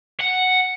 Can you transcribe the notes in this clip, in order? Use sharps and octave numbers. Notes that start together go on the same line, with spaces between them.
F#5